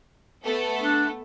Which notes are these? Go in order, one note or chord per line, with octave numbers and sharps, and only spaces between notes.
A3 B3 A4
D4